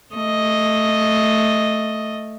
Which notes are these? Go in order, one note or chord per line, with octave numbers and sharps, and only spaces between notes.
A3 D#5